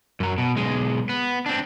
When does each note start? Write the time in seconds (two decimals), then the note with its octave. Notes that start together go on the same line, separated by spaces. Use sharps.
0.20 F#2 F#3
0.38 B2
0.56 B1 G#3
1.09 B3
1.46 C4 D4